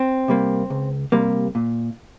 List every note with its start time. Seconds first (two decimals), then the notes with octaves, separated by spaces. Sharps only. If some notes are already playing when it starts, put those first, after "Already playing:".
Already playing: C4
0.28 C3 G3 A#3
0.70 C#2
1.12 C3 G3 A#3
1.55 A#2